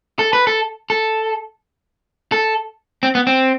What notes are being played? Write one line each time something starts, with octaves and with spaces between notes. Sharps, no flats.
A4
B4
A4
A4
A4
C4
B3
C4